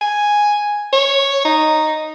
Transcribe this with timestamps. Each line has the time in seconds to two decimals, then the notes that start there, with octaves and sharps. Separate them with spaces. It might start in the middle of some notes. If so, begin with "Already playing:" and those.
0.01 G#5
0.93 C#5
1.45 D#4